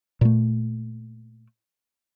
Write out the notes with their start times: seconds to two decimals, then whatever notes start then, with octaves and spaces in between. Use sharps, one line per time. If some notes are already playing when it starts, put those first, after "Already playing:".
0.21 A#2 A3